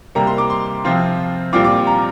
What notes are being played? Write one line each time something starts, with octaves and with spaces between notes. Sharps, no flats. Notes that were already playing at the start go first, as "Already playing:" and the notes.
C3 G3 A#3 A#5
C6
D6
C6
C3 F3 C4 F4
A#2 G3 C4 F4 D6
D6
A#5